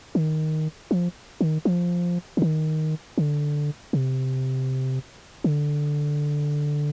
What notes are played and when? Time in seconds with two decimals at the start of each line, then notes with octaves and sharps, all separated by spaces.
0.15 D#3
0.91 F3
1.41 D#3
1.65 F3
2.37 D3
2.42 D#3
3.18 D3
3.93 C3
5.44 D3